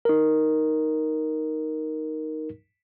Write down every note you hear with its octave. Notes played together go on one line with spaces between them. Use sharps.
D#4 A#4